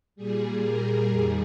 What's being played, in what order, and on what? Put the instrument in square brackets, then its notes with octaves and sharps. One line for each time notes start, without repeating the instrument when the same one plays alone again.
[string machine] A#2 G3 G#4
A#4
F2 D#3 G3 G#4